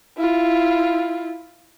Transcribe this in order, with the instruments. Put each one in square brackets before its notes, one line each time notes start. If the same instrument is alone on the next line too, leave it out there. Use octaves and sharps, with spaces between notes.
[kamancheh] E4 F4